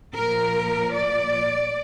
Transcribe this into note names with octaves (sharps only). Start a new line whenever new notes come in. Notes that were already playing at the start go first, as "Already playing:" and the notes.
A#2 F3 A#4
D5